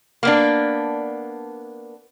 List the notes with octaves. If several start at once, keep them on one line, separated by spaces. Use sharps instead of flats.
A#3 B3 D4